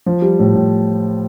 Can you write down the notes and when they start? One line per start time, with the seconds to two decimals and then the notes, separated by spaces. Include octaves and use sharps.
0.06 F3
0.22 G3
0.39 A2
0.55 A2